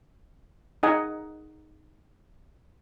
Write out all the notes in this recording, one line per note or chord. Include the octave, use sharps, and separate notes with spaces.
D#4 G#4 D#5 F#5 G#5 A#5